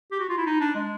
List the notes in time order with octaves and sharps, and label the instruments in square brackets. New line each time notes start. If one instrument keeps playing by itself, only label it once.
[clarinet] G4
F#4
F4
E4
D#4
D4
G#3